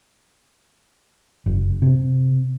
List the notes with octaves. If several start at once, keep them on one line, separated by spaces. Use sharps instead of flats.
F#1
C3